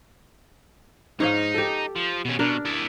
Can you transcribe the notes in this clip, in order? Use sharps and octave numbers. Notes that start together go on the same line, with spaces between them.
G#2 D#4 C#5 F5
G4 A4
F3
B2 C#4
B2 D4 A#4
E4 D5